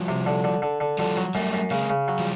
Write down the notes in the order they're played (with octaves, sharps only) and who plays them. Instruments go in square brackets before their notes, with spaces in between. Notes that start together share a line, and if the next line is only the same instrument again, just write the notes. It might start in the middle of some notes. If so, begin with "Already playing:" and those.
Already playing: [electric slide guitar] F3 G3
[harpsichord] C3
D3
D3
D3
D3
[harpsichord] D3 [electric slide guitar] F3 G3
[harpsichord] F#3
[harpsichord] F#2 [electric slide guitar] G3 A3
[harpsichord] F#2
[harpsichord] C#3 [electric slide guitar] G#3 A#3
[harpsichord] C#3
F#3
[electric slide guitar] F3 G3